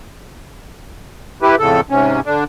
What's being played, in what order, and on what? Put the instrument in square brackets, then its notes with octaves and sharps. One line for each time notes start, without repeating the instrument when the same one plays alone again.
[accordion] E4 G4 B4
F2 A2 C#3 A4
G#2 C3 C#4
D3 D4